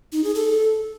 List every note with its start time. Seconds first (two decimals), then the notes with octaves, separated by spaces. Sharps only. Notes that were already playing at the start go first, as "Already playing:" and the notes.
0.12 D#4
0.24 G#4
0.35 A4